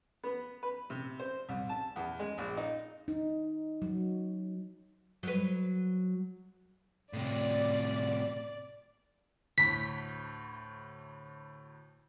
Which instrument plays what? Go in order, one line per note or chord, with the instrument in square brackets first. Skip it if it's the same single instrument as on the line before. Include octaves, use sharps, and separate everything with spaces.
[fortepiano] B3
B4
C3
C5
C2
A5
E2
G#3
A#1
D#4
[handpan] D#4
F#3
[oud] F#3 B4
[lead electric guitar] A2 C3 [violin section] D5
[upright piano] D2 A2 [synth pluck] B6